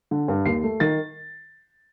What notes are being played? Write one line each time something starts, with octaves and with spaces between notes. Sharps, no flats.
D3
G2
D#2 C7
A3
D#3 A6